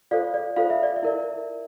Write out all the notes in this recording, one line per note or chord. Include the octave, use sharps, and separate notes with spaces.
F4 A4 C5 D5 F5
D5
F4 A4 C5 F5
E5
D5
E5
E4 A#4 D5